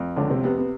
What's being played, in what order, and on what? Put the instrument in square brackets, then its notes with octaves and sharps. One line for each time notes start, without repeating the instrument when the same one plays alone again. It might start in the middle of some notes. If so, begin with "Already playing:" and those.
Already playing: [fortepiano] F2
[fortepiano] C#2 [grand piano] D3 D4
[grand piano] C3 C4
[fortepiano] C3 [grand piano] B3
[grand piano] B3